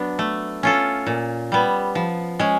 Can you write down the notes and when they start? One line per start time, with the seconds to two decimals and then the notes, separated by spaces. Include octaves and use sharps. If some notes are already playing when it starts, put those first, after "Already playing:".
Already playing: F#3 B3 D4
0.19 A3
0.63 C#4 F4 A4
1.06 A#2
1.52 G3 B3
1.95 F3
2.39 G#3 C#4